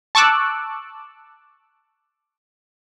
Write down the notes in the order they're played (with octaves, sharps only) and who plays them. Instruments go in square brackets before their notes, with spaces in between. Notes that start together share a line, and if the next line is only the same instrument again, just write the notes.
[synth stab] A5 C#6 D6 E6 F#6